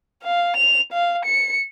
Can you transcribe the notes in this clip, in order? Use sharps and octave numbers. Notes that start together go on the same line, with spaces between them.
F5
F7
F5
C#7